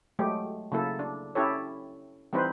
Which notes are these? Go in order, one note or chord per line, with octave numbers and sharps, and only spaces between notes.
F#3 G#3 A3 G4
C#3 F#3 A#3 E4 A4
D4
C#4 E4 G4 A4 C#5
E3 G3 C4 D#4 B4 C5